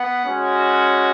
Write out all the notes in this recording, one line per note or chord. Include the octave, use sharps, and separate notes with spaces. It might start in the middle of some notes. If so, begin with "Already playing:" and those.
Already playing: B3 F#5
G#3 C#4 F#4